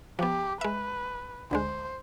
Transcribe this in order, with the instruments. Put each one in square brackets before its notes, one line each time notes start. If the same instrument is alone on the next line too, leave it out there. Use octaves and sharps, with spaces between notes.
[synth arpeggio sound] F3 B3 [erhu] G4
[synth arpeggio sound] G#3 E5 [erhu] B4
[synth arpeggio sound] D2 D3 G#3 [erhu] C5